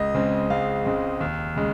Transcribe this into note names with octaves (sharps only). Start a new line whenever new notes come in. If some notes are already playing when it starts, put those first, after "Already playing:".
Already playing: C#2 D#5
C#3 G#3 C4
C#2 F5
C#3 G#3 C4
D#2
C#3 G#3